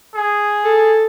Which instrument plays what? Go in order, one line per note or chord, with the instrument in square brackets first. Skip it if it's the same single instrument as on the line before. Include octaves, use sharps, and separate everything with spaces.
[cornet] G#4
[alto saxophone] A4